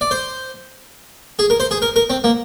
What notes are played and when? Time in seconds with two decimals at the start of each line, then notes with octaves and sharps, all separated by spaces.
0.01 D5
0.11 C5
1.39 G#4
1.50 A#4
1.60 C5
1.71 G#4
1.82 A#4
1.96 A#4
2.10 C4
2.24 A#3